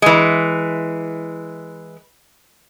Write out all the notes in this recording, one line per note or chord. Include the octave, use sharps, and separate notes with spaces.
E3 G#3